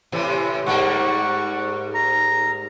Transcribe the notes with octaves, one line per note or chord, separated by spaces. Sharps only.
A2 C3 E3
G#2 G3 A#3 F#5 C#6
A#5